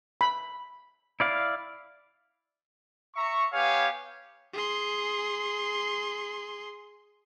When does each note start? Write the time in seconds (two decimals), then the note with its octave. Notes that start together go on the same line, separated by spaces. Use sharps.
0.21 B5
1.20 E4 D5 F5
3.14 E5 A#5 C#6
3.52 B3 G4 C#5 F5 G#5
4.53 G#4 C6